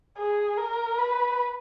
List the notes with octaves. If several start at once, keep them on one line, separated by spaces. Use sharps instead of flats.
G#4
A#4
B4